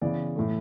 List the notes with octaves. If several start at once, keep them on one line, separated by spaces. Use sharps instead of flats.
C#3 E3 B3 E4 D5
A2 E3 A3